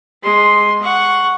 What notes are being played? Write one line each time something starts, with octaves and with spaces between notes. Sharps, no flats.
G#3 C6
F#5 C#6